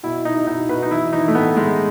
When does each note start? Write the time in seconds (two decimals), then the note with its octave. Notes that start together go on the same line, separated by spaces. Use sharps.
0.03 B2 E4
0.25 B2 D#4
0.47 B2 D#4
0.69 B2 B4
0.83 D#4
0.91 E3 E4
1.13 E3 D#4
1.28 A3
1.34 A2 B3
1.56 A2 G#3